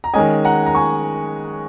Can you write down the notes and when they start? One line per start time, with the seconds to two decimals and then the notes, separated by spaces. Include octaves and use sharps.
0.04 A#5
0.14 D#3 G#3 C#4 D#5 G#5
0.45 F#5 A#5
0.66 A#5
0.75 G#5 C#6